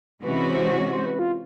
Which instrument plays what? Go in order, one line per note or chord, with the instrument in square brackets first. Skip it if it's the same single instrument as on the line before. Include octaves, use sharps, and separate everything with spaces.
[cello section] C3 E3 G#3 C#4 F#4 [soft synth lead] B4
[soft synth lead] C5
C#5
C5
B4
F4